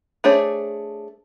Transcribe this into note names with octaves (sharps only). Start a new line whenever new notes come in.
A3 D4 G#4 C5 C#5